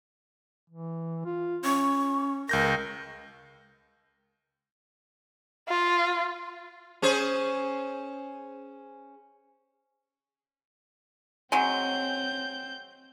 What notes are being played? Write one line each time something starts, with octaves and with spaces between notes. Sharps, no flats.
E3
F4
C#4 C#6
C#2 A#4 G6 A#6
F4
C#4 G#4 C5
F#3 G#3 C4 G6